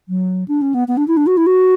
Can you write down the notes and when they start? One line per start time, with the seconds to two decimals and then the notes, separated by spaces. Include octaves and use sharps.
0.09 F#3
0.48 D4
0.62 C#4
0.74 B3
0.88 B3
0.97 D4
1.08 E4
1.17 D4
1.27 F#4
1.37 E4
1.46 F#4